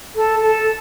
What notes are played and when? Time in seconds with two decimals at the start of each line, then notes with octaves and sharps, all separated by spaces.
0.16 A4
0.42 A4